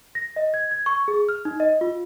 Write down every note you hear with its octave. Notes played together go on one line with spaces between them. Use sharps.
A#6
D#5
G#6
G#6
C#6
G#4
F6
D#4
D#5
F4